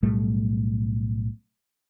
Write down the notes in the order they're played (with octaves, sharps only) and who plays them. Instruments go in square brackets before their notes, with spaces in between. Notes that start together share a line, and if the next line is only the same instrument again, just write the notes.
[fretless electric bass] B1 A2 G3 A3